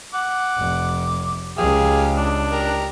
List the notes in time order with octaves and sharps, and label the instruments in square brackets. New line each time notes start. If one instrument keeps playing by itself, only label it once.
[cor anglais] F#5 [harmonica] D6
[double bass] F1
[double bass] C#2 [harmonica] G4 F5 [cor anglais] G#4
[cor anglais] D4
[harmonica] G4 A#4